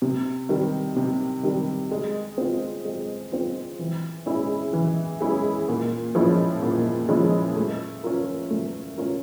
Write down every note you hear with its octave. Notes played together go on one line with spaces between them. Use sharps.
C3
D#3 G3
C3
D#3 G3
G#3
C4 F4
G#3
C4 F4
E3
G#3 C#4 E4 G#4
E3
G#3 C#4 E4 G#4
A#2
F3 G#3 C#4 E4
A#2
F3 G#3 C#4 E4
A3
C#4 F4 A#4
A3
C#4 F4 A#4